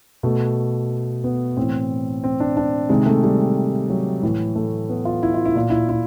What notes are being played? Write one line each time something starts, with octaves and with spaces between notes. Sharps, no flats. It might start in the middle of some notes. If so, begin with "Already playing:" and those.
B2 A3
B3
A2 C4
E3
C4
D4
D4
C3 D#3 G#3
A3
G3
F#3
A2 E3
A3
B3
F4
E4
F4
E4
A#2 F4
E4
E4